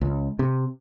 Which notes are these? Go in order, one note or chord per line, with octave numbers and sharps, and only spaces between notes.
C#2
C3